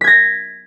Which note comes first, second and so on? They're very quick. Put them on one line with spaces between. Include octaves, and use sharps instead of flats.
B6 G#6 A#6